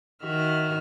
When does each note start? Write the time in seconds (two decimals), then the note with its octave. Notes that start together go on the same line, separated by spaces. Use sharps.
0.23 D#3 F#4 E5 F6